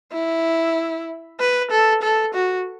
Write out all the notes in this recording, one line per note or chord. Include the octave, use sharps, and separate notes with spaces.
E4
B4
A4
A4
F#4